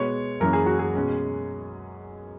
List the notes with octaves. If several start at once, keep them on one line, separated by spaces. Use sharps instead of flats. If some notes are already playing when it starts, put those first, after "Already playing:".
Already playing: B2 G#3 B3 C#5
F#2 E3 A#3 C#4 A#4
G#4
F#4
G#4
B2 G#3 C#4